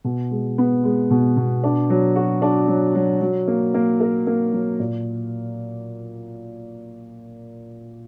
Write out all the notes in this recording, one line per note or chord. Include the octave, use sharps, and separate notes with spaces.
B2
G#3
B3
G#3
B2
B2
D4
F#3
F#4
D4
F#3
F#3
F#3
A#3
A#3
A#4
A#3
F#3
A#2